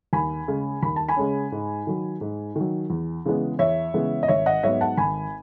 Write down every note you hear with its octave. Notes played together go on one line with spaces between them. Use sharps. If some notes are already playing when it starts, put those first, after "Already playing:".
D#2 G#5 B5
C#3 G#3 C#4
D#2 B5
A5
G#5 B5
C#3 G#3 C#4
G#2
D#3 F#3
G#2
D#3 F#3
E2
C#3 E3 G#3 B3
E2 C#5 E5
C#3 E3 G#3 B3
D#5
G#1 C#5 E5
D#5 F#5
G#2 F#3 B3 C#5 E5
F#5 A5
G#1 G#5 B5